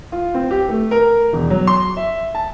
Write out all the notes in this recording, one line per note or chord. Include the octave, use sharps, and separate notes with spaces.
F4
C4
G4
A3
A#4
E1
F#3
C6
E5
A5